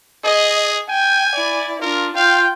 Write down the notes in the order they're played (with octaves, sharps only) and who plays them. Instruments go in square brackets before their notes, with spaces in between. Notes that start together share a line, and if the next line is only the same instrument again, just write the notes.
[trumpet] G#4 [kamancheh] D#5
[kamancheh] G5 [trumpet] G#5
[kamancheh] E4 D5
[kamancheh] D4 F4 [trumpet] A#4
[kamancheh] F4 G5 [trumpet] F5